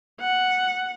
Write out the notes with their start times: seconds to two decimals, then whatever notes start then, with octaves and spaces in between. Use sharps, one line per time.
0.21 F#5